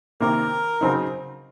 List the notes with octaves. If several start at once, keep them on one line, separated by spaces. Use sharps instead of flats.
C3 D#3 A#3 A#4
C#3 F#3 C4 D#4